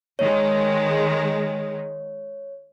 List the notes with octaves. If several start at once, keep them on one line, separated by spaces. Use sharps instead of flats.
D#3 G#3 C#5